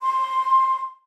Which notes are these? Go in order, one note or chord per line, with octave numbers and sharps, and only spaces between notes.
C6